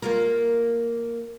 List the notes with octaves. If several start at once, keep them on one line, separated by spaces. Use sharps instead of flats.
A#3 F4 A#4